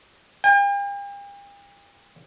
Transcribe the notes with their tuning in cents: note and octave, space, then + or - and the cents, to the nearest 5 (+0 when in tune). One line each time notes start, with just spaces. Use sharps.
G5 +45